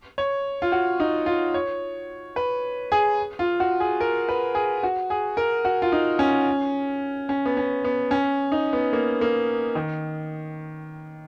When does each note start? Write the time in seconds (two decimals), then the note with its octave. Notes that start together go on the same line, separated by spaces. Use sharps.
0.18 C#5
0.62 F4
0.72 F#4
1.00 D#4
1.26 F4
1.54 C#5
2.36 B4
2.92 G#4
3.39 F4
3.60 F#4
3.80 G#4
4.00 A#4
4.29 B4
4.55 G#4
4.83 F#4
5.10 G#4
5.37 A#4
5.65 F#4
5.82 F4
5.92 D#4
6.19 C#4
7.29 C#4
7.46 B3
7.57 C#4
7.84 B3
8.11 C#4
8.52 D#4
8.73 B3
8.93 A#3
9.21 A#3
9.75 D#3